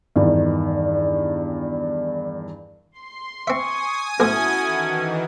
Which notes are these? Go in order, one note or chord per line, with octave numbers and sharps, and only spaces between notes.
E2 G2 D#3
C6
C4 E5 G#5 C#6 D#6
B1 A2 C#4 E4 F#4 A4 C5
D#3 E3